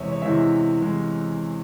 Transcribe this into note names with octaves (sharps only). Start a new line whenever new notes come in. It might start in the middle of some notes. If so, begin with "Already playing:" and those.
Already playing: E2 C3 E3 G#3 C#5 E5
C#5
E2 C3 E3 G#3 E5
C3 E3 G#3